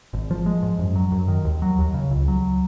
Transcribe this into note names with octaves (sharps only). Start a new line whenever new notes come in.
G#1
F3
G#3
G#2
F#2
F#3
F#2
D#3
D#2
F#3
D#2
C#3
C#2
F#3